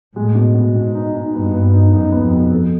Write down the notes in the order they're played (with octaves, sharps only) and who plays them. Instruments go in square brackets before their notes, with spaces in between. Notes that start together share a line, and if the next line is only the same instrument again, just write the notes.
[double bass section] A2 [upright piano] G#3
[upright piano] B2
B2
[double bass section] G#2 [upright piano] B2
[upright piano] D#4
D#4
[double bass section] G2 [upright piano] B3
[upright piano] B3
D#4
[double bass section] F#2 [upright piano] D#4
[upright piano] B3
[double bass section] F2
[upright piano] B2
A4